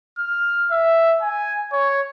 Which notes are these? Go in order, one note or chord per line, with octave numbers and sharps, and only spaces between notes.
F6
E5
G#5
C#5